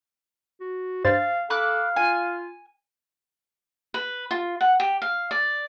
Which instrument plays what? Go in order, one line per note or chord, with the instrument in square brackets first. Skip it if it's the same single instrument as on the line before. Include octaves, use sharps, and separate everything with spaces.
[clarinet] F#4
[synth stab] G2 C5 A6 [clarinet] F5
[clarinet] A4 [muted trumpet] F5 [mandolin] B5 D6 F#6
[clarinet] F4 [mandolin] G#5
[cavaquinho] B4
F4
F#5
G4
F5
D5